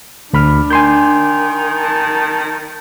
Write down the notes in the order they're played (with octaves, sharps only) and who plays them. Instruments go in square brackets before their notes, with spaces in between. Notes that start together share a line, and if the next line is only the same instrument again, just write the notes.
[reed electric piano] D2 B5 F6 [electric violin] D4
[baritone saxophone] D#3 [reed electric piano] G#5 C6 G6
[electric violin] A5